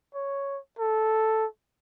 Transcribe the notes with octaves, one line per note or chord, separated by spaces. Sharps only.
C#5
A4